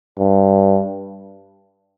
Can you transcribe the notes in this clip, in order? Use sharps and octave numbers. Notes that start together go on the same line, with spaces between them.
G2